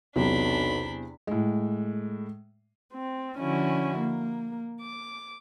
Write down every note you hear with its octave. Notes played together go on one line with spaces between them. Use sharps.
B1 E2 C3 F#3 D4 B5
A2 G#3
C4
D3 F3 C#4 E4 F#4
A#3
D6